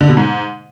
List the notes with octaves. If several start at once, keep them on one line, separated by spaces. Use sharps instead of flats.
D3
B2
G#2